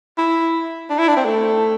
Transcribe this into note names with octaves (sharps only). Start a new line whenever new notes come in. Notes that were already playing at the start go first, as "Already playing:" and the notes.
E4
D4
E4
D4
C4
A3